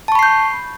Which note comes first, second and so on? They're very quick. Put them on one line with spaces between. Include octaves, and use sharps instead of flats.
A5 C#6 B5 C7 G6